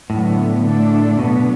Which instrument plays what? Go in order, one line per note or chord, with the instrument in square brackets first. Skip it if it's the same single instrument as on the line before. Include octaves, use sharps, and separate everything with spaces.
[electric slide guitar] A2 [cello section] D3 F#3 B3
[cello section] D3 A3 D4 A4
[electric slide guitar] B2 [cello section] D3 F#3 B3